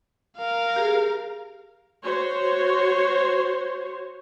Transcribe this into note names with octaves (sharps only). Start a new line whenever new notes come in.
A#4 F5
G4 G#4
F#4 C5 C#5